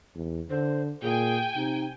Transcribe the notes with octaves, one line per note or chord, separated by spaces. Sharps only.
E2
D3 C5
A#2 G#4 G5 G#5
C3 D#4